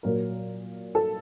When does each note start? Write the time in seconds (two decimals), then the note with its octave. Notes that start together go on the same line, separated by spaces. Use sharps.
0.03 A#2 F#3 A#4
0.95 A4